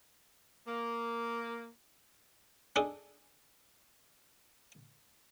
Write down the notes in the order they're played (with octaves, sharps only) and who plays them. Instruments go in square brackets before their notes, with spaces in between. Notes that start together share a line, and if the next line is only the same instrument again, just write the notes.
[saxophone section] A#3
[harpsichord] D4 D#4 G#4 A4